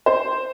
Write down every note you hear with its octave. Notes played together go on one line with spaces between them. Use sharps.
C5